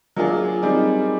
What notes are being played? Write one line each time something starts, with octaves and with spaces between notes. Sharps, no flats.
F#3 A#3 D4 F4 G#4
G3 C4 D#4 G#4